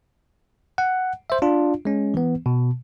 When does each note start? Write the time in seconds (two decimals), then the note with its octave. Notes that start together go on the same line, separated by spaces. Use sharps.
0.78 F#5
1.30 C5 E5
1.42 D4 F4
1.85 G#3 C#4
2.14 E3 B3
2.46 B2